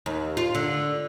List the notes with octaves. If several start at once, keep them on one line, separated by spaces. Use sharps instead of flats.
D#2
F4
D3